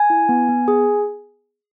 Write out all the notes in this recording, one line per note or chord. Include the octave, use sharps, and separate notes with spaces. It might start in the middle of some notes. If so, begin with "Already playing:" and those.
Already playing: G#5
E4
B3
B3
G#4